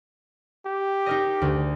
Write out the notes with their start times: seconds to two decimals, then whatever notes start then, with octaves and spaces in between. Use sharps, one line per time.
0.66 G4
1.06 D#4 A#4 D#5
1.42 D2